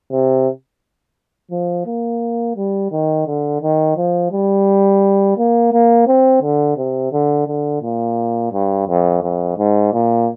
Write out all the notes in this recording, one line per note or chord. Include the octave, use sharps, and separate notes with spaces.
C3
F3
A#3
G3
D#3
D3
D#3
F3
G3
A#3
A#3
C4
D3
C3
D3
D3
A#2
G2
F2
F2
G#2
A#2